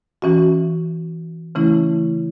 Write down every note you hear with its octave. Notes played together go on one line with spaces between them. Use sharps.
E3 C#4 F#4
C#3 E3 A3 C#4 E4